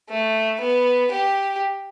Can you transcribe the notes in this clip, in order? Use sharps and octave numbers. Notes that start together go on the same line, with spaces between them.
A3
B3
G4